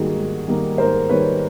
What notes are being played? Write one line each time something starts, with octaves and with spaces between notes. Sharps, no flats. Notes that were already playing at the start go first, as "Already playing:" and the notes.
Already playing: G#2 D#3 G3 A#3 F#4 G#4
G#2
D#3 G3 A#3
G#2 A#4 C5
D#3 G3 A#3 B4 C#5